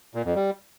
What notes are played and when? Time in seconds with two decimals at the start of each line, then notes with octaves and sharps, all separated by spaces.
0.15 A#2
0.25 F2
0.35 G3